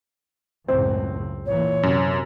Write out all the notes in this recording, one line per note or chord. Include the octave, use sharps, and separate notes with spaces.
C#2 F#2 A2 C4
A#2 E3 C#5
F#2 C3